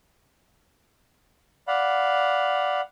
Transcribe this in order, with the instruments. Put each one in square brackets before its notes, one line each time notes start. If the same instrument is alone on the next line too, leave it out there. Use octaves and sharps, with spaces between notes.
[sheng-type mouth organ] D5 F5 F#5 B5